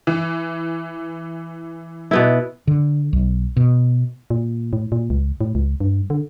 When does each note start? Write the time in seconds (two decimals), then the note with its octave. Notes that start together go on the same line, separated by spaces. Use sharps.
0.07 E3
2.11 B2 B3 E4
2.67 D3
3.13 B1
3.57 B2
4.30 A#2
4.73 A2
4.92 A#2
5.10 C#2
5.41 A2
5.55 C#2
5.80 G2
6.10 D3